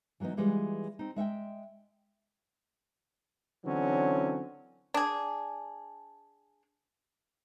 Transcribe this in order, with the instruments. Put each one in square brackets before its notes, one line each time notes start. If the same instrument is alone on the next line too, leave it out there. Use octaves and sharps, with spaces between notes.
[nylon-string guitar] E3 F#3 A#3 B3 D#4
E3 G3 G#3 F4 B4
C4 D#4
G#3 E5 F#5 G5
[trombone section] D3 E3 F#3 C4 C#4
[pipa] D4 G#4